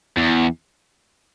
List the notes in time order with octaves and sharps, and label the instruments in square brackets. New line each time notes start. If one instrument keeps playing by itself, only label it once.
[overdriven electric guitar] E2